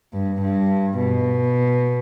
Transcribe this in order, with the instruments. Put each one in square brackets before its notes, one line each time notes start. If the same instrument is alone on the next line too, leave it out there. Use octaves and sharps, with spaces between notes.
[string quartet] G2
G2
B2